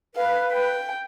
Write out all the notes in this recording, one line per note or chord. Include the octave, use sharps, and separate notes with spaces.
B4 F5
G5